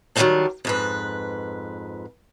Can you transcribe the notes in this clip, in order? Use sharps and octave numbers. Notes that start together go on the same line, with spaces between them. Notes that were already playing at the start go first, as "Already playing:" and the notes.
D#3 F#3 G3 A3 C4 D4
F2 G#2 B4